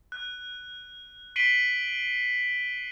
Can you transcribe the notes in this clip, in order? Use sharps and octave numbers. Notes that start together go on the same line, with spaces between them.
F#6
B6 C7 D7 D#7 F#7 G7